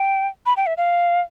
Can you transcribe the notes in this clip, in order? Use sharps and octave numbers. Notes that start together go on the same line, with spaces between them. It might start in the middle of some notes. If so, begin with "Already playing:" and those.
Already playing: G5
B5
G5
E5
F5